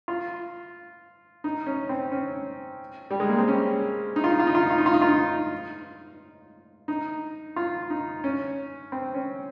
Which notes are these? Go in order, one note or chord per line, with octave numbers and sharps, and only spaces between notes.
F4
D#4
C#4
C4
C#4
G3
G#3
A#3
C4
C#4
D#4
F4
D#4
F4
D#4
F4
D#4
F4
D#4
F4
D#4
F4
D#4
D#4
F4
D#4
C#4
C4
C#4